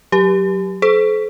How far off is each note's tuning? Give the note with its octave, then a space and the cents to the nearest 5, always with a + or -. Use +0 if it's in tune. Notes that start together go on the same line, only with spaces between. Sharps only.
F#3 +0 G4 +0
A4 -40 C5 -20